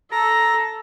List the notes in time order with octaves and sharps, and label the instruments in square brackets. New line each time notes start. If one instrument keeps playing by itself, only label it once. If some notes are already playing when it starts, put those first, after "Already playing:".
[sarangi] A4 [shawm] A#5